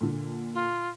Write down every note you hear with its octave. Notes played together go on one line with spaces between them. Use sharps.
A#2 D3
F4